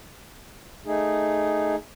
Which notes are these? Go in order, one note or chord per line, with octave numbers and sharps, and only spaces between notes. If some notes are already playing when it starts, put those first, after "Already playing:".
A3 D#4 G#4